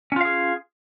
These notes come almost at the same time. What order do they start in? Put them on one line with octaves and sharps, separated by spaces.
C#4 F4 F5 G#4